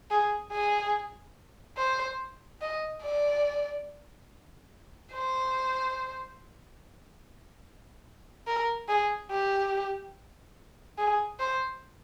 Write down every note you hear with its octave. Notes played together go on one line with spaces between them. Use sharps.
G#4
G#4
C5
D#5
D5
C5
A#4
G#4
G4
G#4
C5